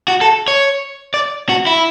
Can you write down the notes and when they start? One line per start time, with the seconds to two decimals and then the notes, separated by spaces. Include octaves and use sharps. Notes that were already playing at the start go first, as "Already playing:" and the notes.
0.08 F#4
0.21 A4
0.48 C#5
1.14 D5
1.49 F#4
1.67 E4